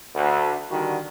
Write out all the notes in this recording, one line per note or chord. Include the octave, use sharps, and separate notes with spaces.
D2
D3 D#3 G3 F#4